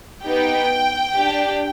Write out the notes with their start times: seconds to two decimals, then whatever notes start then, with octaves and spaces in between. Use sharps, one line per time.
0.25 B3 D#4 G4 G5
1.19 D4 G4